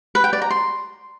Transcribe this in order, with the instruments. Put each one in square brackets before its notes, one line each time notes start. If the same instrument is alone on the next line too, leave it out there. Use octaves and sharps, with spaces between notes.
[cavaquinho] B4
G5
D5
A#5
C6